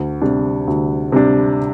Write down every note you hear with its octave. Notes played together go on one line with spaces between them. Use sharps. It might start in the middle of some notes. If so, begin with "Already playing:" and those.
Already playing: D2
C3 G3 D4
D2
C3 G3 D4